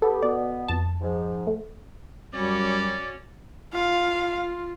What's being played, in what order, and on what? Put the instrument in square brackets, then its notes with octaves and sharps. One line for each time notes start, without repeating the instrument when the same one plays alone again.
[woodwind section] B3 G4 [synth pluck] A4
[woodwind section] B2 B3 [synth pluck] D5
[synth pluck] F2 A5
[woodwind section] G#2 F3
[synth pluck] A3
[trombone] F#2 [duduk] G3 [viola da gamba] C#4 F#4 [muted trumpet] D5
[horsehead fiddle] F4 [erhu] F5